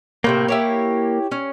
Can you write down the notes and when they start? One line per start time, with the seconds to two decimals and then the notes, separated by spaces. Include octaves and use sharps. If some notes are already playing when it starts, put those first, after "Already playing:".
0.24 A2 C3 A#3 E4
0.48 E4 G4 C#5
1.31 C#4